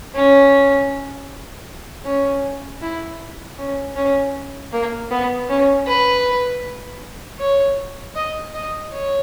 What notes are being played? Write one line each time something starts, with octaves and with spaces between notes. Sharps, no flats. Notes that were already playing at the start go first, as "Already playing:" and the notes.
C#4
C#4
E4
C#4
C#4
A#3
B3
C#4
B4
C#5
D#5
D#5
C#5